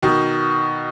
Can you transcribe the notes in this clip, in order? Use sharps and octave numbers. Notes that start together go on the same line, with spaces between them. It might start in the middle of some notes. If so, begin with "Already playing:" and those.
B2 D#3